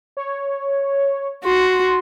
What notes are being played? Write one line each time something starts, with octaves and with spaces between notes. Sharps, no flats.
C#5
F#4 C6